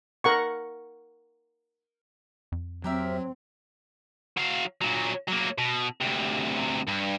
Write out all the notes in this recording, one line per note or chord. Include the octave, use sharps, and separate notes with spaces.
A#4 F#5 C#6
F2
F#3 C4 G4 A#4 E5
F#3 F5
A#2 F#3
F#3 A#3
B2
D2 C3
G2